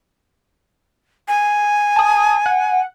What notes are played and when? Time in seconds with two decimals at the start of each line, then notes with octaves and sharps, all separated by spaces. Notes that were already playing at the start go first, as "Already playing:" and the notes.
1.28 G#5
1.96 A5 D#6
2.46 F#5